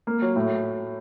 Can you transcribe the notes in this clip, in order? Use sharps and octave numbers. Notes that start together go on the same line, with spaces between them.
A#3
F#3
A2